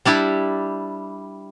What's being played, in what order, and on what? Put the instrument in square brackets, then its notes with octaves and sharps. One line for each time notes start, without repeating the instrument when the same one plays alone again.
[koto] G3 D4 E4 G4